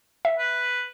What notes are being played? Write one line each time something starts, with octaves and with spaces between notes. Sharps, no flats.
E5
B4